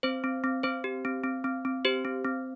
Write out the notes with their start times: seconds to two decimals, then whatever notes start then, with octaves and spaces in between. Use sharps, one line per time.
0.03 C4 C5
0.24 C4
0.44 C4
0.63 C4 C5
0.84 G4
1.05 C4
1.24 C4
1.44 C4
1.65 C4
1.85 G4 C5
2.05 C4
2.24 C4